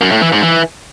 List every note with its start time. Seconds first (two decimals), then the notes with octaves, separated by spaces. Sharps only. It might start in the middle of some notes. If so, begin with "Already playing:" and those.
0.01 F#2
0.12 A2
0.22 E3
0.32 G#2
0.43 E3